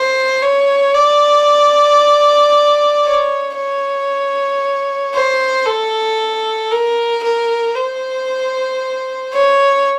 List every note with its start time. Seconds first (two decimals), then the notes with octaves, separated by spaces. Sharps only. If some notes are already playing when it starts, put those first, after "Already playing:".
Already playing: C5
0.42 C#5
0.94 D5
3.04 C#5
3.56 C#5
5.14 C5
5.65 A4
6.71 A#4
7.23 A#4
7.75 C5
9.33 C#5